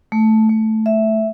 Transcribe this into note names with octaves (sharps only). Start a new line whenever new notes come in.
A3
A3
E5